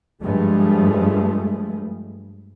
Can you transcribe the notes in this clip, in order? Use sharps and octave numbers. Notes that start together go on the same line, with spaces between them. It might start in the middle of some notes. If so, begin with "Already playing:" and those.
G2 F3 G#3 A3